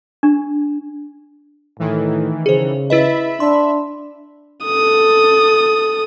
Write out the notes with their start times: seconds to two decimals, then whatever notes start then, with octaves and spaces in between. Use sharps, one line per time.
0.23 D4
1.79 A2 D#3 E3
2.46 C#3 G#4 C5
2.90 E4 B4 D#5 E5 B5
3.40 D4 C6
4.65 A4 D#6